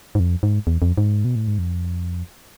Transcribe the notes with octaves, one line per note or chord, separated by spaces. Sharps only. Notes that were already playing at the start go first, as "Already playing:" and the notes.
G#2
F2
G#2
E2
F2
G#2
B2
A2
G#2
F2